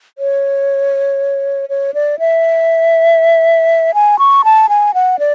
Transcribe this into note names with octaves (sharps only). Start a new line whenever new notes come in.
C#5
C#5
D5
E5
G#5
C#6
A5
G#5
F#5
D5